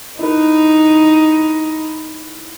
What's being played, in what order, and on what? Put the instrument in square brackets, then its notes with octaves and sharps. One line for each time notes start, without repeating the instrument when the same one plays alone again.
[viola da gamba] D#4 [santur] E4 B4